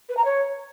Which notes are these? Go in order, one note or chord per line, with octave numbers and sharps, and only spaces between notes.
B4
A#5
C#5